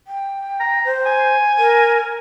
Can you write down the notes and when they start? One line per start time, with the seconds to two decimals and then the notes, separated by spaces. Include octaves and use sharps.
0.07 G5
0.60 A#5
0.85 C5
1.06 G#5
1.58 A#4